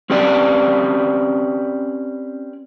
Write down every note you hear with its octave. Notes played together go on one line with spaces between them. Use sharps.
C4 C#4 G4 B4 D5